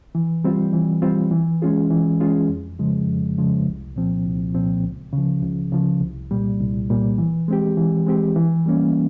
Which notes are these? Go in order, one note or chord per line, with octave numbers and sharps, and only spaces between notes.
E3
G3 C4 F4
E3
G3 C4 F4
E3
G#3 C#4 F4 G#4
E3
G#3 C#4 F4 G#4
F2
C#3 F3 G#3
F2
C#3 F3 G#3
C2
A#2 F3 C4
C2
A#2 F3 C4
C#2
C#3
F3
C#2
C#3 F3
C2
A#2 G3
C2
A#2 G3
E3
G#3 C4 G4
E3
G#3 C4 G4
E3
G3 A#3 C#4